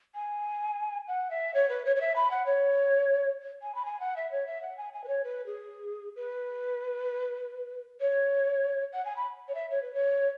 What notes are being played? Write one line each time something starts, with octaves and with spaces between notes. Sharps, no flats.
G#5
F#5
E5
C#5
B4
C#5
C#5
E5
B5
F#5
C#5
G#5
B5
G#5
F#5
E5
C#5
E5
F#5
G#5
G#5
B4
C#5
B4
G#4
B4
C#5
F#5
G#5
B5
C#5
E5
C#5
B4
C#5